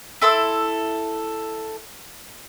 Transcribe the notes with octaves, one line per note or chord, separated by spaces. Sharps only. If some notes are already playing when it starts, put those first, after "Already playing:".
E4 A4 C6 E6